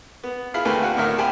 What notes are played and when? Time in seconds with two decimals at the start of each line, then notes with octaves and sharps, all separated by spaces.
0.23 B3
0.54 E4 F4 G#4 F5 B5
0.65 D2 A3 A#3 B4 G5 G#5
0.83 F#4 F#5
0.96 D2 A2 D#3 A#4 E5 F6
1.18 G4 C5 G5 G#5 B5